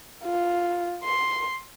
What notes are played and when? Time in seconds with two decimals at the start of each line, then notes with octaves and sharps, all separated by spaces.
0.24 F4
1.04 C6